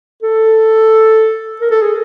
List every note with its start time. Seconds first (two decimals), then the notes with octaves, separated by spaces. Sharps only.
0.23 A4
1.61 A#4
1.71 A4
1.81 G#4